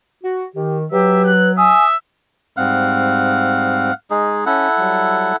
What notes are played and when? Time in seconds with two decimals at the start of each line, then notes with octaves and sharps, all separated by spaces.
0.23 F#4
0.55 D#3 G4
0.91 F#3 G4 B4 E5
1.24 F#6
1.57 E5 G#5 D#6
2.57 G#2 G3 C4 F5 F#5
4.10 G#3 D#4 G#4
4.46 C#4 E4 A4 F#5
4.79 F#3 G3